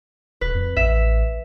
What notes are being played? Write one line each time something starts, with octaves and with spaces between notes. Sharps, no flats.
E1 B4
F2
A1 E5